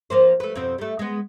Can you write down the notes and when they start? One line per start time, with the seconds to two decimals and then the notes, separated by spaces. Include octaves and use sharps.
0.10 F3 A#3 C5
0.40 A3 B4
0.55 F2 B2 C4
0.78 G3 A3
0.99 G#3 B3